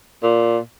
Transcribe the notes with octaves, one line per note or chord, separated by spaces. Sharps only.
A#2